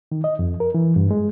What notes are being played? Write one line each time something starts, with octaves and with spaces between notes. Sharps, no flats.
D#3
D#5
F2
A#4
E3
G2
G#3